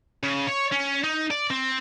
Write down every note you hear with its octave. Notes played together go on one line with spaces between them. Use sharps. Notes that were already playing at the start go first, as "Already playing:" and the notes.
C#3
C#5
C#4
D#4
D5
C4